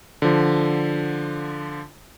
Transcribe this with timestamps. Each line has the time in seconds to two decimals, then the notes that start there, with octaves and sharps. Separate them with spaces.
0.22 D3 F3